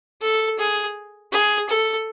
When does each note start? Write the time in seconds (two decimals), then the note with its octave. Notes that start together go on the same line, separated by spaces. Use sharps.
0.22 A4
0.59 G#4
1.32 G#4
1.69 A4